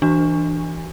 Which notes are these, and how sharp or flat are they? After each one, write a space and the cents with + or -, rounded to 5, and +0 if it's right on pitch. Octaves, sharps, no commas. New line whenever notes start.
E3 +0 D4 +10 F#4 +25